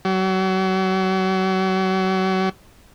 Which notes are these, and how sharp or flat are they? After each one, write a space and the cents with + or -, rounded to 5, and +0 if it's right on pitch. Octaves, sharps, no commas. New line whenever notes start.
F#3 +35